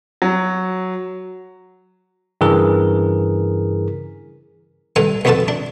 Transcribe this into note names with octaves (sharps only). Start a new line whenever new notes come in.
F#3
G2 C#3 E3 G#4 A#4
G2 A4 F#5 G#5 A#5
B1 F2 B3 F#4 A4 A5
D4